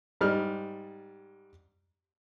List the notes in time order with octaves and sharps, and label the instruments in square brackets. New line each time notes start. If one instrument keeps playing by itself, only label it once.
[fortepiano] G#2 G3 F6